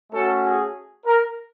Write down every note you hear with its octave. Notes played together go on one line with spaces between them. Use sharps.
A3 C#4 F#4 A4
G#4
A#4